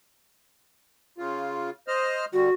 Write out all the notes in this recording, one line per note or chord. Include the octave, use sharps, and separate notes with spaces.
C#3 F4
C5 D#5 F6
D3 G3 F#4